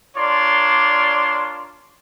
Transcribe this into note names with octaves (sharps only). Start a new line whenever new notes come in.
D4 F4 A#4 C#5 D5 C6